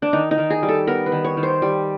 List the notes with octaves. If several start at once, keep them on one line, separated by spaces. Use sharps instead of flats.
D4
D#3 D#4
D#4
D#3
G#4
G3
A4
B3 A#4
B4
D#3
C#5
D#3
C5
G3